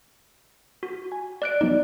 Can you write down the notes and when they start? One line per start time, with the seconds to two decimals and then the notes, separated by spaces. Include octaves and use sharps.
0.83 F#4
1.11 G#5 G#6
1.42 D5 F#6 D7
1.61 F#3 B3 D#4 D5